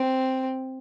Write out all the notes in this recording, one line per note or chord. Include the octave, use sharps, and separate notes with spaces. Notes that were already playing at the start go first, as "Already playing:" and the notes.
Already playing: C4